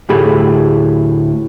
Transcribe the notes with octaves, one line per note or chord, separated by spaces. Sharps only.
D2 A2 A3 G4 G#4 B5